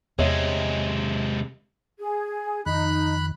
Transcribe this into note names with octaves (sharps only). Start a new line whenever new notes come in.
E2 C3 G#3 C#5 D#5 E5
G#4
F2 D#3 D#4 B5 F#6